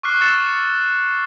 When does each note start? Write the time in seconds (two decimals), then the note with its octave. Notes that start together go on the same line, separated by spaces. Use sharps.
0.03 C#6 D6 F6 F#6 C7
0.21 C#6 E6 A6 C#7 E7